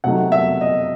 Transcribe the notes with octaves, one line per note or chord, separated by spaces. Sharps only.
C3 F#3 A3 D#4 F#5
E5
D#5